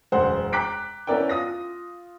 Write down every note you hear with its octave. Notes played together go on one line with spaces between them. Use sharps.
E1 F#2 C5 F#5
G5 A#5 D6 F#6 B6 D7
B3 C#4 E4 A#4 D5 G5
F4 D#6 A#6